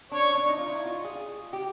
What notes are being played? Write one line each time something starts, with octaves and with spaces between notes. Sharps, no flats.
D4 C#5
C#4
D4
D#4
F4
E4
F4
G#4
G4